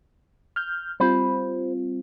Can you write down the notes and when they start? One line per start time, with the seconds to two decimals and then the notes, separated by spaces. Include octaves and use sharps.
0.56 F6 G6
1.00 G3 C4 F4 C5 B5